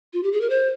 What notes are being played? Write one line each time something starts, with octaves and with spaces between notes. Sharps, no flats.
F4
G4
G#4
A#4
C5